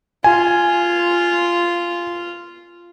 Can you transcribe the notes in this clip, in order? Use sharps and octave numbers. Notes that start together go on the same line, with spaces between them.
F4 G#5